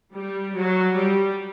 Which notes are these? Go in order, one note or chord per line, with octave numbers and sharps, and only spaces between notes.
G3
F#3
G3